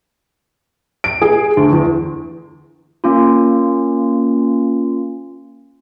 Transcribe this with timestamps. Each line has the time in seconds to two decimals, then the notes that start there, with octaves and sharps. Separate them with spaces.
1.04 D7
1.22 G#4
1.57 D2
1.72 E2
3.04 A#3 C#4 F4